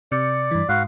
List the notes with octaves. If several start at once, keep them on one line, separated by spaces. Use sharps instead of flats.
C3 D5 C#7
G2 E3
G#2 F#4 B4 F5